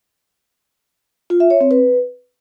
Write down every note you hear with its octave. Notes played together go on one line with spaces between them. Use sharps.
F4
E5
C#5
C4
B4